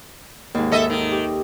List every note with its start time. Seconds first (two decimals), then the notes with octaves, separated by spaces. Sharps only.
0.54 D#2 G#2
0.72 A4 D#5 E5
0.90 D#3
1.12 G4